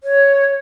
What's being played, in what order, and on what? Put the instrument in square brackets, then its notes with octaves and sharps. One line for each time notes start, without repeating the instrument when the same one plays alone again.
[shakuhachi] C#5